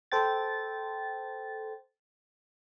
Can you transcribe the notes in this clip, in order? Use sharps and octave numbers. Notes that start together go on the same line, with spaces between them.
A4 C5 G5 A6